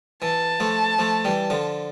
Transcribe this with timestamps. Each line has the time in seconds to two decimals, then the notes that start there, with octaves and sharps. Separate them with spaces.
0.22 E3 A5
0.60 F3 A3
0.98 F3 A3
1.25 E3 G3
1.50 D3 F3